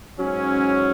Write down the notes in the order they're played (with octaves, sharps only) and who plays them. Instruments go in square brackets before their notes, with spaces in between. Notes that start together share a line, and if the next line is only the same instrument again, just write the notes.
[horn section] G#2 F#3 C#4